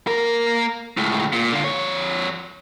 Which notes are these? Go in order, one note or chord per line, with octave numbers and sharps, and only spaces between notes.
A#3 A#4
C#2 A2
A#2
D3 F4
F2 C#5